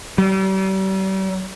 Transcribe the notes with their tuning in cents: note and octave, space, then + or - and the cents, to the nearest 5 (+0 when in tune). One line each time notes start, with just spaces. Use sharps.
G3 -40